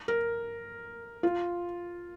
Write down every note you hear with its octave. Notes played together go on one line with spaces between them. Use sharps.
A#4
F4